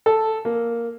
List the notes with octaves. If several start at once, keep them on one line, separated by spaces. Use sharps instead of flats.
A4
A#3